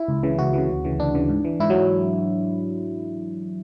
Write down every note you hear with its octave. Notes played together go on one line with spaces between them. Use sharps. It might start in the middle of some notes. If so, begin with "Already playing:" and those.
Already playing: E4
C#2
C#3 E3
C#2 F#4
C#3 E3
D2
C#3 E3
D2 D4
C#3 E3
G#2
E3
G#2 E4
F#3